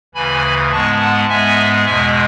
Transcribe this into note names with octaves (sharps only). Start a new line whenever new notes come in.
D2 C#3 E3 G#5 B5
G#2 G#3 B3 A5 C#6
F#5 A5
G#2 G#3 B3 E5 G#5
E2 B2 G#3 E5 G#5